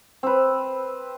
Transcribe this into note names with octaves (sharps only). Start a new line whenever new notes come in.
C4 B4